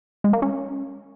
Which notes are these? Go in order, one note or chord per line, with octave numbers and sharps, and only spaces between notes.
G#3
A#3
C#4